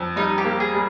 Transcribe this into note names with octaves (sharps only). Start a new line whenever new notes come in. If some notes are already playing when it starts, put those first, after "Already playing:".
Already playing: F2
G3 D#4
G4
A#3
G#4
G3